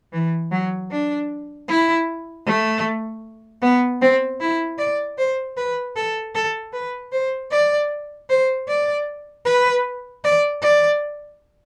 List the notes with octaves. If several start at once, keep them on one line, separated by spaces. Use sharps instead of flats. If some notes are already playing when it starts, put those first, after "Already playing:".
E3
F#3
D4
E4
A3
B3
C4
E4
D5
C5
B4
A4
A4
B4
C5
D5
C5
D5
B4
D5
D5